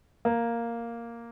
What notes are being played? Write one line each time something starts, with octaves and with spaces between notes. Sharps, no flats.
A#3